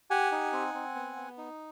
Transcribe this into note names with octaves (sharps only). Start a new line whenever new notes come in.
G4 F#5 G#5
D#4
C4
C4
B3
B3
D#4